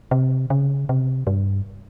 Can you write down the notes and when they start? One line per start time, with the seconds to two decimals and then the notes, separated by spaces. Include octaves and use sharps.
0.11 C3
0.50 C#3
0.89 C3
1.27 G2